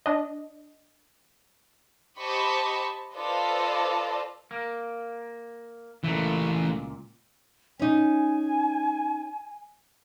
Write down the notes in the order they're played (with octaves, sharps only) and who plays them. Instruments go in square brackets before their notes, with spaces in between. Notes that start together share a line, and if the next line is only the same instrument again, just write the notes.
[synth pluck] D4 D#5
[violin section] G4 C5 D#5 A5 B5 C#6
F4 A4 B4 C5 D5 D#5
[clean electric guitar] A#3
[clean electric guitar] C#2 A#2 [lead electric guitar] E3 A3
[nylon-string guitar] C#4 D#4 [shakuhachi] G#5